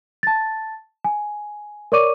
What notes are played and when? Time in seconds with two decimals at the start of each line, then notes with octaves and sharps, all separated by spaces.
0.23 A5 A6
1.04 G#5
1.92 A#4 C#5 D5 C#6 D6 D#7